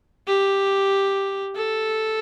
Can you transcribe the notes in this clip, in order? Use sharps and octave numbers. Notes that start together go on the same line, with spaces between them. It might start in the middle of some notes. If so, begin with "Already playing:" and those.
G4
A4